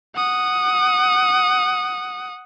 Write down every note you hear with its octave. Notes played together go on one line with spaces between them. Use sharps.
F#5 D#6